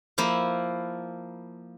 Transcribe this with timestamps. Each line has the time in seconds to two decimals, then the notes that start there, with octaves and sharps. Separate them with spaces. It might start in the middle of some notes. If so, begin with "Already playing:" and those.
0.18 F3 A#3 E4